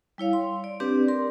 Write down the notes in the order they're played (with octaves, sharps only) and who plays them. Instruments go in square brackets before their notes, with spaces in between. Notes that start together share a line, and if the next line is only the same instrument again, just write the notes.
[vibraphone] G3 E4 C#5 F5
C6
D5
C4 D4 G4 B4 D5
A#4 C6